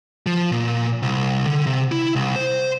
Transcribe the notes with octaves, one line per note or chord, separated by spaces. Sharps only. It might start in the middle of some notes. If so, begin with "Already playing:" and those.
F3
A#2
C2
D3
C3
E4
C2
C5